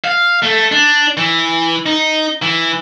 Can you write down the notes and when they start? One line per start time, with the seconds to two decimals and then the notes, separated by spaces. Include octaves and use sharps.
0.04 F5
0.42 A3
0.72 D4
1.17 E3
1.86 D#4
2.42 E3